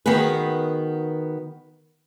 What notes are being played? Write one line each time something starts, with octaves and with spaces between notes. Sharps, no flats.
D#3 B3 F#4 G#4 B4